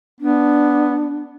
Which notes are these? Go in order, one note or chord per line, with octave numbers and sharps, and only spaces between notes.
B3 D4